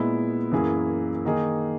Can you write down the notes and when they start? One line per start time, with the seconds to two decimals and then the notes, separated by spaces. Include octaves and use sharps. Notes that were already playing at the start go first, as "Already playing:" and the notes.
Already playing: A#2 G#3 B3 E4
0.51 F#2 E3 A#3 E4 G#4
1.25 D#3 A#3 D#4 G#4